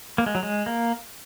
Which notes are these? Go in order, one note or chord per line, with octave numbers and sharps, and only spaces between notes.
A#3
G#3
F#3
G#3
A#3